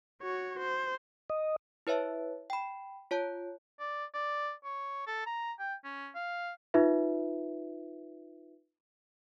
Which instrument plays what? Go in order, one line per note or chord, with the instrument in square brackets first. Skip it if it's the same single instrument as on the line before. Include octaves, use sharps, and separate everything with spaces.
[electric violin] F#4 C#5
C5
[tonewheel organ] D#5
[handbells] E4 B4 C#5 E5 A5
G5 B5
F4 C#5 A5 G6
[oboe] D5
D5
C#5
A4
A#5
G5
C#4
F5
[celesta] D#4 F4 B4 E5